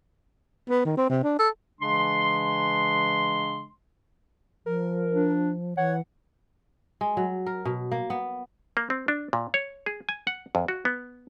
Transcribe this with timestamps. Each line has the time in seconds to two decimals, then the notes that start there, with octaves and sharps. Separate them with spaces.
0.70 B3
0.85 D#3
0.97 C4
1.09 C3
1.24 D4
1.39 A4
1.81 C#3 E3 G#3 D4 C6
4.66 F3 A#4
5.13 D4
5.77 E3 C#5 F#5
7.01 G#3
7.17 F#3
7.46 A#4
7.65 B2
7.92 A#3
8.10 B3
8.77 A#3
8.90 C4
9.08 D4
9.33 A#2
9.54 C#5
9.86 G#4
10.09 G#5
10.27 F#5
10.55 F2
10.68 F#4
10.85 B3